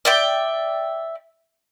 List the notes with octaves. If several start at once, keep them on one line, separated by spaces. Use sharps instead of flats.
D5 E5 G5